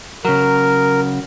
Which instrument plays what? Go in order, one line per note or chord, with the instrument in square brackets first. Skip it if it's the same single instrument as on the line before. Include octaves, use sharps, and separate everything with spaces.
[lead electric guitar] C#3 F#3 [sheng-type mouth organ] A#4